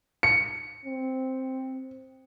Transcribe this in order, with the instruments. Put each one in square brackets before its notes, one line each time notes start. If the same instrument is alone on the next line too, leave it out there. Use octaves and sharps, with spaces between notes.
[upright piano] C#7
[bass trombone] C4